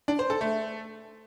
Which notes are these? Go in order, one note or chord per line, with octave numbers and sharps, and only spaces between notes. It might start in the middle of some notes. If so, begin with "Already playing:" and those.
D4
C5
A4
A3